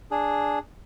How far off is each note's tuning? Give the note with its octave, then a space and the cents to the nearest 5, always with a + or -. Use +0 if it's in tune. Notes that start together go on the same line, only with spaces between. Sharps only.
D4 +0 G#4 +0